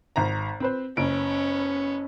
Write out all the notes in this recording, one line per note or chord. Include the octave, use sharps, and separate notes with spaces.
G#1 A#5
C4 B4 C5
F#1 B3 C#4 D7